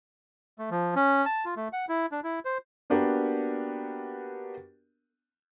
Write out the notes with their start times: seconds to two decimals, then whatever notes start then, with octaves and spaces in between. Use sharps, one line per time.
0.59 A3
0.71 F3
0.96 C#4
1.25 A5
1.45 F4
1.56 A3
1.73 F#5
1.89 E4
2.12 D4
2.24 E4
2.45 C5
2.90 A#3 B3 D4 F#4 G4 A#4